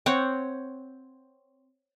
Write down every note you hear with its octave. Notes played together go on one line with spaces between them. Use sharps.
C4 C#5 F#5